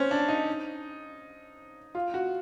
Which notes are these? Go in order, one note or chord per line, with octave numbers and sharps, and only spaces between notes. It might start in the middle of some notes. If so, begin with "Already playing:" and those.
Already playing: C4 C#4
D4
D#4
F4
F#4